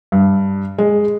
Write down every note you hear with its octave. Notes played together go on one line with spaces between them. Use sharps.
G2
G#3